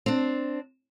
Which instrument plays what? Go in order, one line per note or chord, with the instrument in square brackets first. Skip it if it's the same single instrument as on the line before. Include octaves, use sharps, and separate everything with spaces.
[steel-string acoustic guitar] C4 D4